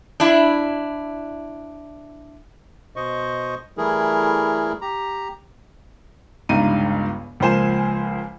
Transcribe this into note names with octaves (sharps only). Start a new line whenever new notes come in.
D4 E4
B2 C5 D#5 C#6
E3 G3 A3 E4 G#4 A#4
G4 A#5
G1 C#2 G2 D#4 D#7
C#2 F3 A#3 C5 G#5 E7